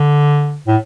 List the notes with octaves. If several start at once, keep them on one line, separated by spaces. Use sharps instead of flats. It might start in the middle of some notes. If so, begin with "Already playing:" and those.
Already playing: D3
A2